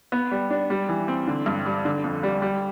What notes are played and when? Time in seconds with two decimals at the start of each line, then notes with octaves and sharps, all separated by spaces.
0.12 B3
0.31 G3
0.50 D4
0.70 G3
0.89 E3
1.08 C4
1.27 D3
1.46 G2
1.66 G3
1.85 D3
2.04 F2
2.23 G3
2.42 G3